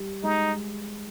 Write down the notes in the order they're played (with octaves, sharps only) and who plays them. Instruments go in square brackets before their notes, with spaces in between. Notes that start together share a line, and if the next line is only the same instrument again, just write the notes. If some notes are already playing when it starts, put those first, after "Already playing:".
Already playing: [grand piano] G3
[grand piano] G#3 [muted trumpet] D#4